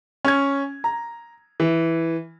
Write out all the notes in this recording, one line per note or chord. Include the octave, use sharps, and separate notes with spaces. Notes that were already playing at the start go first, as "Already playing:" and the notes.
C#4 G#6
A#5
E3